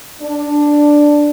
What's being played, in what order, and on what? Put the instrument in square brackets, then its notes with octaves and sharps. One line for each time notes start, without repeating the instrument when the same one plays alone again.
[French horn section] D4